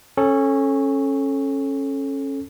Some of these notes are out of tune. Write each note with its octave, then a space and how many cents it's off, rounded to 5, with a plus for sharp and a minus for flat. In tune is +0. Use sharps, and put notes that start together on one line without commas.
C#4 -20 A4 -10 C#6 +0